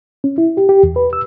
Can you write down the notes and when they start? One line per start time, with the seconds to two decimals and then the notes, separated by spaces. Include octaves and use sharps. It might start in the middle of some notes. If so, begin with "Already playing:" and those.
0.24 C#4
0.38 E4
0.57 G4
0.69 G4
0.83 E2
0.96 B4
1.13 E6